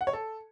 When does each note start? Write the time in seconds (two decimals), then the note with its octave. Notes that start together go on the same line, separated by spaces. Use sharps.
0.01 F#5
0.07 C#5
0.13 A4